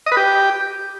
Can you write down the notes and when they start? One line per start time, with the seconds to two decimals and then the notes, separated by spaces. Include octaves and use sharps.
0.06 D#5
0.12 B4
0.17 G4